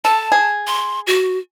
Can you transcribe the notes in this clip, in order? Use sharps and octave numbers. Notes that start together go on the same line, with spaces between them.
A4 A5
G#4
C6
F#4